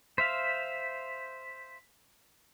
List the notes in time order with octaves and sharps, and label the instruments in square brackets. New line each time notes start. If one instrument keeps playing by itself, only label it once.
[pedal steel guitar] C5 E5 F5 [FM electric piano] B6